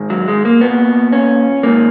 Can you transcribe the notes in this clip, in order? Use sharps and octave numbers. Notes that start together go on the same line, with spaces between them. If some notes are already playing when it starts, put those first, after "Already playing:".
Already playing: G#2 D#3
F#3
G#3
A#3
A#2 B3
C#4
G#2 D#3 A#3